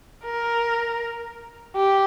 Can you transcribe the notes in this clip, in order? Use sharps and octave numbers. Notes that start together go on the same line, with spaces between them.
A#4
G4